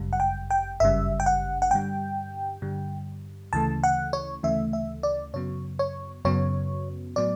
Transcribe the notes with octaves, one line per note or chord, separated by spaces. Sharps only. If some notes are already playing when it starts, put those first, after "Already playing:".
Already playing: G1 F#2 C#3 G3
F#5
G5
G5
G1 F#2 C#3 G3 E5
G5
F#5
F#5
G2 D3 G3 G5
G2 D3 G3
D2 C#3 E3 A3 A5
F#5
C#5
D2 C#3 E3 A3 E5
E5
D5
F#2 C#3 F#3 B3 C#5
C#5
F#2 C#3 F#3 B3 C#5
A2 F#3 B3 D5